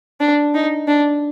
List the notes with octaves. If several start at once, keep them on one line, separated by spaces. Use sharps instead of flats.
D4
D#4
D4